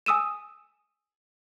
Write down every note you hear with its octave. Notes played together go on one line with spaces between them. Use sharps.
G#5 D#6 E6 D#7 E7